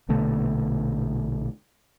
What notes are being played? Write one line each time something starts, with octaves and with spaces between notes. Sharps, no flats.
A#1 B2 D3 A3